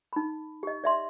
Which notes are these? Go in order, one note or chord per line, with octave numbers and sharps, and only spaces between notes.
D#4 B5
G4 D#5
D5 E5 C6